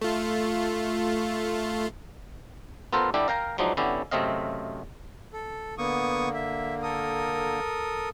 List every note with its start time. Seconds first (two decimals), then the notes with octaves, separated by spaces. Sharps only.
0.01 A3 F4
2.93 B3 F4 A4 A#4 C5
3.14 D3 G3 D4 E4 G4
3.28 A#4 F5 G5 A#5
3.58 F3 F#3 G#3 D4 D#4
3.77 D3 B3 C#4 E4 G4
4.11 F#2 C3 A3 C4 D#5 F5
5.33 A4
5.78 D3 A#3 B3 C#6 D#6
6.34 E5
6.83 A4 A#4 D#6